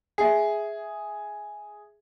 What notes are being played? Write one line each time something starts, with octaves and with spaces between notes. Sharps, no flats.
G#4 E5 C7